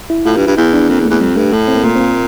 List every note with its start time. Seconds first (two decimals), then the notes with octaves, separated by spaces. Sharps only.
0.10 E4
0.25 A2 F4
0.36 G2
0.47 G2
0.57 E2 E4
0.73 D4
0.89 F2 A#3
1.00 E2
1.05 A3
1.10 E2
1.21 F2 G3
1.36 G2 A3
1.53 A2
1.68 C4
1.75 A#3
1.84 A#2 A3
1.95 C4
2.00 A#3